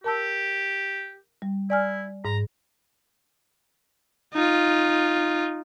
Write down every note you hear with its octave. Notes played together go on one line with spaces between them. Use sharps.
G4 A#4 A5 E6
G3
E4 D5 G#5 F6
G#2 A#5
D#4 F4